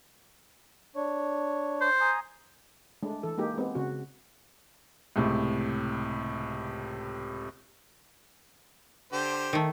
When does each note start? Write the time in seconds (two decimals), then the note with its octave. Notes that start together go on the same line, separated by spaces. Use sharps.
0.96 D4 C#5
1.81 C5
2.01 G#5 A#5 D#6
3.03 G#3 A3 D4
3.23 E3 A4
3.38 G#3 A#3 D#4 G4
3.57 G#3 B3 C4 G4
3.75 C#3 F#4
5.16 C#2 A2 C3
9.13 D3 G4 C5
9.53 D#3 A3